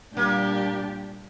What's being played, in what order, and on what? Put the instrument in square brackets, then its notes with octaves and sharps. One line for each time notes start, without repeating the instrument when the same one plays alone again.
[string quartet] A#2 G3 D4 G4 [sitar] A#3